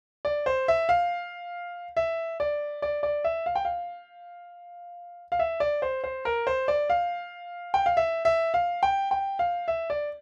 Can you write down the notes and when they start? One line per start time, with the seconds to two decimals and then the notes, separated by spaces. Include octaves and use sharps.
0.25 D5
0.46 C5
0.68 E5
0.89 F5
1.97 E5
2.40 D5
2.82 D5
3.03 D5
3.24 E5
3.46 F5
3.56 G5
3.65 F5
5.32 F5
5.39 E5
5.60 D5
5.82 C5
6.04 C5
6.25 A#4
6.47 C5
6.68 D5
6.90 F5
7.74 G5
7.86 F5
7.97 E5
8.25 E5
8.54 F5
8.83 G5
9.11 G5
9.39 F5
9.68 E5
9.90 D5